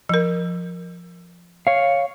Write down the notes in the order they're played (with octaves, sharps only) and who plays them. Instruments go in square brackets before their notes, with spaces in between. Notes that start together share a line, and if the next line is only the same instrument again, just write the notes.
[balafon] F3 A#4
[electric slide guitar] C#5 F5